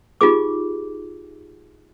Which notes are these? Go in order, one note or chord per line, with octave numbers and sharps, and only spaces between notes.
D#4 F4 G4 G#4 D6